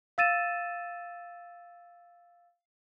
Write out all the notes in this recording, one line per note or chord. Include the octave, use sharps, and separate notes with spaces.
F5 E6 A6 D#7 E7